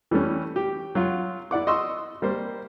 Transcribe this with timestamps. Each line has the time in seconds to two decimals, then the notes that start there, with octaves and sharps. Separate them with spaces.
0.11 E3 G3 A3 C#4
0.56 G4
0.95 F#3 F4 F#4
1.51 E4 D5 F#5 D6
1.67 D#5 F#5 C6 C#6 E6
2.22 G3 A#3 C5